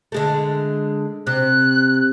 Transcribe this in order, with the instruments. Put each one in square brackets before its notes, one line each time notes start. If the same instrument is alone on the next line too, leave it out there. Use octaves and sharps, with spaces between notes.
[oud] D3 G#3 A3
[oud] C3 [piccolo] F#6